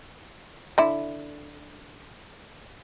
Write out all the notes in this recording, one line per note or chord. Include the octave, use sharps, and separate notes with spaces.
D3 E4